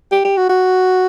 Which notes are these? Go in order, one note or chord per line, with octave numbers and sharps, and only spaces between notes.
G4
G4
F#4
F#4